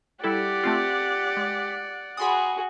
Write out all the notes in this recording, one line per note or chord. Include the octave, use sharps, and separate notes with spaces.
G3 E4 G4 A4 D5 F#5
A3 C4 F4
G#3
F#4 G#4 B5 C6 D#6